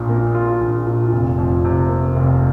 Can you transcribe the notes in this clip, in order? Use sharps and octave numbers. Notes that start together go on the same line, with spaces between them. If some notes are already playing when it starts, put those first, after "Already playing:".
Already playing: A#1 A#2
A#3
F4
A#1
A#2
F1
F2
C3
A#3
F1